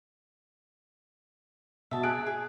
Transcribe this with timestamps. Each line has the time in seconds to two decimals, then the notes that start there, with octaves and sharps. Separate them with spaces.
1.91 B2 E5 A5
2.03 G#4 A5 F#6 D7
2.26 G#4